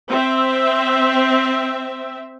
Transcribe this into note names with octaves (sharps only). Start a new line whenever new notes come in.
C4 E5